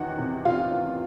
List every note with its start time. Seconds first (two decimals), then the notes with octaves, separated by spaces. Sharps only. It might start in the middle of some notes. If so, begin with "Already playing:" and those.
Already playing: E2 D#3 F#4 F#5
0.18 C3
0.45 C3 F4 F5
0.72 E2